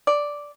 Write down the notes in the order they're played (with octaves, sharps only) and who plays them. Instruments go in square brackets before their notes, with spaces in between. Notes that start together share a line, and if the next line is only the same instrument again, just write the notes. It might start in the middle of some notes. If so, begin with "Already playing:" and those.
[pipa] D5